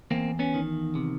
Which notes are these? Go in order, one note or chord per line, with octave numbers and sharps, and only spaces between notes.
E2 A#3 C4
B3 C#4
D#3
C3